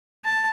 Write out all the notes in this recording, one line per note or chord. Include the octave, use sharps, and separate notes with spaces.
A5